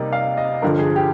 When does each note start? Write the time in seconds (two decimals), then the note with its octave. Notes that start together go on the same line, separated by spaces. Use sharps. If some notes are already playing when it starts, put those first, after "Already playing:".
Already playing: C3 G3 A#3 D#4 D5
0.13 F5
0.38 D#5
0.62 G2 D3 F3 A#4
0.79 G#4
0.96 G4